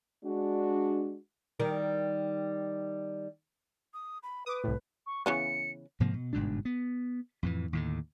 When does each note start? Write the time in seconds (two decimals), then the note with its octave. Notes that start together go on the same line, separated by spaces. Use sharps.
0.24 G#3 D4 F#4
1.60 D#3 G3 A#4
3.94 D#6
4.23 B5
4.46 B4 D6 D#6
4.64 C2 A2
5.06 C#6
5.26 C#3 E3 B3 C#7
6.00 G#2 C3 F3 A#3
6.14 B2
6.33 G1 G#2 B2 D4
6.65 B3
7.43 F2 A2 E3
7.73 D#2 A2 D3